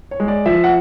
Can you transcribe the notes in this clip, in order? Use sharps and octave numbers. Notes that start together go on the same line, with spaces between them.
C#5
G#3
D5
F3 E5
F#5